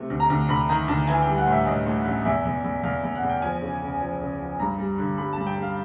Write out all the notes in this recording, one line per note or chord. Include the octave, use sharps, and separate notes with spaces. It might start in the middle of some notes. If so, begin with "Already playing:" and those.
Already playing: C3 A3
D2
A#5
D2
D2 B5
D#3 A#5
D2 A5
E3 G#5
G5
G3
F#5
A2
E5
A2 D#5
A2
A1
E2 E5
E2
E2
E2 F5
E2
F#5
E2
G5
F3 G#5
C#3
C#2
F3
C#2
F3
G2 A#5
G3
D3
G3 B5
A5
G2
G5
G3 F5